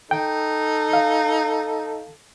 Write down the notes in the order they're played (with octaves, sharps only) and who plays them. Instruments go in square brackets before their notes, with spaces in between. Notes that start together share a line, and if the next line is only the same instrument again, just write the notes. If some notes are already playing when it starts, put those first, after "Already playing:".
[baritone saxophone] D#4 [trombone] A4 [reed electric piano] G5
[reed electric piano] F5